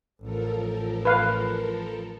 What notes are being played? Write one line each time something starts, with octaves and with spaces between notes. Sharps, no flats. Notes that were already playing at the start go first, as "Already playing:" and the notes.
A1 F3 A4 A#4
B4 F5